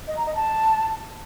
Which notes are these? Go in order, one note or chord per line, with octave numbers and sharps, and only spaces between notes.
D#5
A#5
D#5
A5